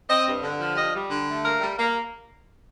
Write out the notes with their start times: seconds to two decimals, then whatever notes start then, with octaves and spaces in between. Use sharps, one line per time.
0.08 C4 D#5
0.25 G2
0.42 D3
0.59 F3
0.76 G3 D#5
0.94 G3
1.10 D3
1.28 A3
1.44 A#3 A#4
1.61 G3
1.78 A#3